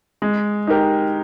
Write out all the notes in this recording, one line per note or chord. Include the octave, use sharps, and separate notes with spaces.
G#3
D#4 G4 A#4